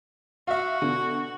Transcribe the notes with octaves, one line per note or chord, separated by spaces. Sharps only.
F#4 E5 F5
B2 D3